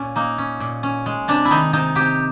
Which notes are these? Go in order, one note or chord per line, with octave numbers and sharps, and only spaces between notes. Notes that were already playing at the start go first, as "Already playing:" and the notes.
Already playing: A#2 C#4
A#3 D#4
C#4
A#2
C#4
G#3
C3 D4
E4
D#3 D#4
C3 D#4
C3 G4